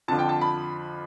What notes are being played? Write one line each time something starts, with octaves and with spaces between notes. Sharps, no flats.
F2 D3 F3 A5
G5
A5
B5